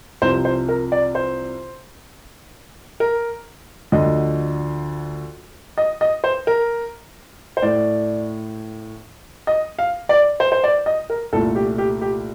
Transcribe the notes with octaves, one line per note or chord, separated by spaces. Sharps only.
C2 C3 F3 C5
C5
A#4
D5
C5
A#4
D2 D3 F3 D#5
D#5
D#5
C5
A#4
C5
A2 A3 D5
D#5
F5
D5
C5
C5
D5
D#5
A#4
C2 A#2 A3 A4
G4
G4
G4